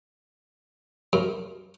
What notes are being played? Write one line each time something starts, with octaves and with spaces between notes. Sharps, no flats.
F#2